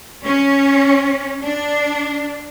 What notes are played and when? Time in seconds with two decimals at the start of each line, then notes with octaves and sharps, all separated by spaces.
0.24 C#4
1.42 D4